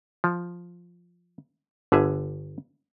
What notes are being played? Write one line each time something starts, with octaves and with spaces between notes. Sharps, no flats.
F3
G1 D3 G#4 E5